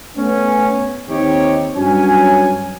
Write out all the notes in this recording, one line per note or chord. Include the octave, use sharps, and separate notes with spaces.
A3 B3 C#4
D#2 C4 D#4 G4 C#5
G2 F#3 C#4 G#5